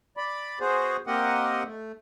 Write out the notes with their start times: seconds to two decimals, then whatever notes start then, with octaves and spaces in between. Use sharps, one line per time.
0.17 D5 B5
0.60 B3 F#4 G#4 C5
1.07 A#3 C4 G4 A#4 D#5 F#5
1.65 A3